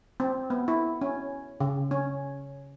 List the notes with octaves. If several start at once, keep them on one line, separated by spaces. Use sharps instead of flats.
C4
B3
E4
C#4
C#3
C#4